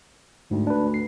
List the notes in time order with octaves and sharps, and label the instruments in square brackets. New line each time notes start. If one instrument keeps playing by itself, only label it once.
[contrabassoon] D2 [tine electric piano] G#2
[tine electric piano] D4 B4
C7